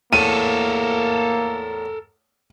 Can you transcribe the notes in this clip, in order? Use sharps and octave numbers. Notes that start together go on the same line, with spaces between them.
E2 A2 A#3 A4 A#4 D#7